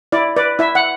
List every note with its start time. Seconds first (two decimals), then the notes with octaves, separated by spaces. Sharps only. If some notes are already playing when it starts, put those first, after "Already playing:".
0.12 E4 D5
0.36 B4 D5
0.59 E4 E5
0.75 F#5